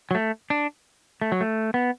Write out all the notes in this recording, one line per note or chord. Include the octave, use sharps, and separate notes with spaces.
F#3
A3
D4
A3
F#3
A3
B3